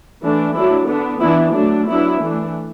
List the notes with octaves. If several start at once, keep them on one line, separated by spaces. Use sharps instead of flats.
E3 A3 D4
F#3 A3 D4 E4
D3 B3 D4
E3 B3 D4 E4
F#3 A3 D4
F#3 B3 D4 E4
E3 A3 D4